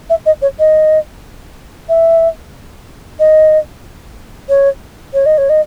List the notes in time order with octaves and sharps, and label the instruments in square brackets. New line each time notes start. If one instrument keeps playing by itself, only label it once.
[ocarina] E5
D#5
C#5
D#5
E5
D#5
C#5
C#5
D#5
C#5
D#5